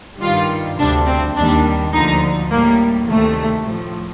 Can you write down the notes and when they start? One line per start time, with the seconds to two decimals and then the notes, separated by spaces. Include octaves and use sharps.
0.21 G2 D#3 G3 F4
0.78 D2 C3 G3 D4
1.07 C4
1.36 D#2 D#3 G3 D4
1.93 D2 D3 F3 D#4
2.51 A2 G3 A#3
3.08 D2 C3 D#3 A3
3.67 A2 F3